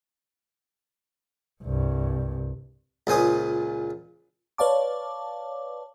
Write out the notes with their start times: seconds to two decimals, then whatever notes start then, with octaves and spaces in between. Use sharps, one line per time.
1.63 C2 G2
3.07 C#2 A#2 C5 G#5 D#6
4.58 B4 C#5 D5 F5 A5 D6